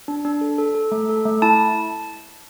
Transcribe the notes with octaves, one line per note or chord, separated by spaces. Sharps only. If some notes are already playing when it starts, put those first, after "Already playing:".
D4
D4
A4
A4
A4
A3
A4
A3
E4 A5